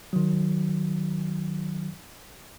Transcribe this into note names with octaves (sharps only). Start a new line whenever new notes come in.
D#3 F#3